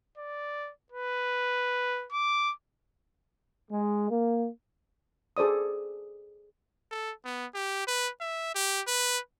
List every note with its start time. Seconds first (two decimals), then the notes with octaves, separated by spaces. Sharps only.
0.18 D5
0.92 B4
2.12 D6
3.71 G#3
4.10 A#3
5.37 G#4 A4 C5 D5 D#6
6.91 A4
7.25 B3
7.54 G4
7.87 B4
8.20 E5
8.55 G4
8.87 B4